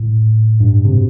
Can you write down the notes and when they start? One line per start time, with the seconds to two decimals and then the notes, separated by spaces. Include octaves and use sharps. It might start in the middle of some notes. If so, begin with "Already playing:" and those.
Already playing: A2
0.60 G2
0.85 C3
0.94 B2